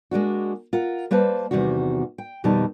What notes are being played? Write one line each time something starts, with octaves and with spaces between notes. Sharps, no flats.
G#3 A#3 D4 F#4
F4 A#4 F#5
G3 A#3 B4 C5 A5
E2 G2 C3 D#3 G3 F#4
G5
F2 B2 D#3 G3 D#4 A5